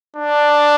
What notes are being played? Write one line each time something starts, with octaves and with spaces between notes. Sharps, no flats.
D4